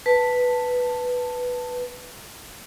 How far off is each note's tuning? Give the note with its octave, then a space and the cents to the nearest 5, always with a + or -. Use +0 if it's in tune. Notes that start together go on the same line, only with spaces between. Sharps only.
B4 +0 A5 +10